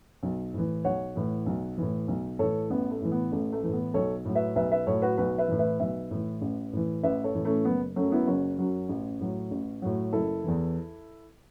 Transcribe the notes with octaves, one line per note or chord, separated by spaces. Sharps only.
B1
A2 E3
B1 C#5 F#5
A2 E3
B1
A2 E3
B1
A2 E3 A4 C#5
A1 B3
A3
A2 E3
B3
A1 A3
A3
A2 E3 A3
B3
B1 A4 C#5
A2 F#3
B4 E5
B1 B4 E5
B4 E5
A2 F#3 A4 C#5
F#4 B4
B1 F#4 B4
B4 E5
A2 E3
B4 E5
B1 B4 E5
A2 E3
A1
A2 E3
A1 B4 E5
A4 C#5
A2 E3
A3 C#4
F#1 B3
F#2 F#3 A3 C#4
B3 E4
F#1 C#4 F#4
F#2 F#3
A1
A2 F#3
A1
A2 F#3
F#1 E4 A4
E2 E3